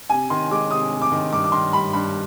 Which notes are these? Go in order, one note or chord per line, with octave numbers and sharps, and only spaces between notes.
C3 G#5
D#3 C6
G#3 D6
C3 D#6
C3
D6
D#3
G2 D6
D6
D#3 C6
G3 B5
G2 B5